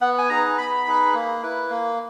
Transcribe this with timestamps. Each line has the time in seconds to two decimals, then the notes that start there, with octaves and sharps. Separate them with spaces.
0.01 B3 F#5
0.18 G#5
0.30 D#4 G#4 B4 A#5
0.58 B3 B5
0.87 D#4 G#4 B4
1.14 A#3
1.43 E4 B4
1.71 A#3